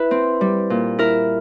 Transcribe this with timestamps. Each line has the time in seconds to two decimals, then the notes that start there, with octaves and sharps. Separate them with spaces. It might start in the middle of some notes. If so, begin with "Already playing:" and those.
Already playing: E4 B4
0.11 C4
0.41 G3
0.70 A#2
0.99 E4 A#4